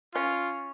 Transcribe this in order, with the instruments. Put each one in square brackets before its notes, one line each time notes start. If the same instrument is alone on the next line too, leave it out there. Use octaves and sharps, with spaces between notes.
[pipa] C#4 [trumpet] F4